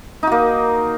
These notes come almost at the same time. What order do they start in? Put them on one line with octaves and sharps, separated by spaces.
D#4 F#4 A#3